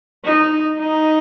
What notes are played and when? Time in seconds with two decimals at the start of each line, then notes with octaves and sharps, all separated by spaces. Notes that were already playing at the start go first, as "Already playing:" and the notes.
0.25 D#4
0.80 D#4